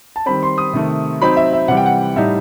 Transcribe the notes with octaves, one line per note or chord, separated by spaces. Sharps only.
A5
D#3 G3 C4 B5
C6
D#6
C3 D#3 A3
F#3 C4 D#4 B5
E5
E5
C3 E3 G3 F#5
G5
F#5
A2 G3 D#4 E5